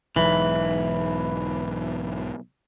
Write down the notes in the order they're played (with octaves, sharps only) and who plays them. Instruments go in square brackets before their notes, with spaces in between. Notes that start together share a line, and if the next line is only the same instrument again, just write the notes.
[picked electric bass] B1 G#2 [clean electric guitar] E3